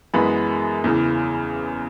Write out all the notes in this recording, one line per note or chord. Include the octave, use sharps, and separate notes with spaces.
F#2 E3 G#3 B3 B5
E2 C#3 E3